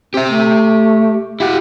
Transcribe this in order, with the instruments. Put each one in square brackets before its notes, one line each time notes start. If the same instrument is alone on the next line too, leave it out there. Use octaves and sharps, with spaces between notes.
[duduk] C4 [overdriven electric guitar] G4 E5
[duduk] A3
[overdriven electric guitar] E4 F#4 [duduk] G4